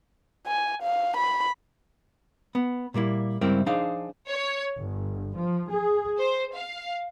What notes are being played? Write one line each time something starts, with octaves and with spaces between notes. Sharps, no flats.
G#5
F5
B5
B3
A#2 G3 A#3 E4
C#2 G2 G3 C4 E4 A#4
F3 D4 D#4 G#4 C5 F5
C#5
G1
F3
G#4
C5
F5